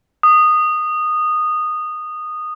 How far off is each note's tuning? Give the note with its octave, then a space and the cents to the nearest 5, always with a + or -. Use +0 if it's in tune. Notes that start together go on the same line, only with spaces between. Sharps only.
D#6 -15